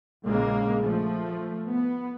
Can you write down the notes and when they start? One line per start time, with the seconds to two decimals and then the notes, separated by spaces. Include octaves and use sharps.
0.25 A#1 C#3 G#3 A#3
0.83 F3 A3
1.67 B3